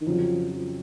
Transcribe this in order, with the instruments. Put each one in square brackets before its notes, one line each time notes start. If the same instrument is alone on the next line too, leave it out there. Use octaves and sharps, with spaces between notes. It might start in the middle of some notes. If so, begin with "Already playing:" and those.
[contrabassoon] D#3
[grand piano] F2 C#3 F#3 C#4 [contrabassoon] F3